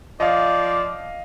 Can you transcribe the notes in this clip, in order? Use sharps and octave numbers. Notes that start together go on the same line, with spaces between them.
F3 D5 D#5 F5